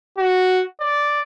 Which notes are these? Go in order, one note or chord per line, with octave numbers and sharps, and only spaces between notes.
F#4
D5